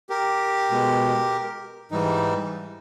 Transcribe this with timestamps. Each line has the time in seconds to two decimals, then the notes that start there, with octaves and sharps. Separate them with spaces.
0.10 G4 A#4
0.71 B2 G#3
1.91 G#2 E3 G3 D#4